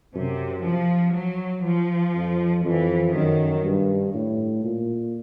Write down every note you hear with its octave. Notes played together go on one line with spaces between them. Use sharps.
F#2 C3
F3
F#3
F3
F2
F2 E3
F#2 D#3
G2
A2
A#2